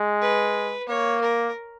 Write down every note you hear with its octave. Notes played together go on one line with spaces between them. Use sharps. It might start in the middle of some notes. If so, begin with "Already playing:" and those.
Already playing: G#3
B4
A#3 C#5
A#4